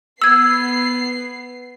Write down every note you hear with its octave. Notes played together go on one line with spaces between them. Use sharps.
B3 E6 G#6 C7